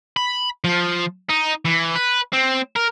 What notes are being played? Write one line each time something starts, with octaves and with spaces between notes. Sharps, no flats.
B5
F3
D#4
E3
B4
C4
A#4